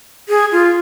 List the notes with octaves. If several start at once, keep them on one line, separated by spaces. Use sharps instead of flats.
G#4
F4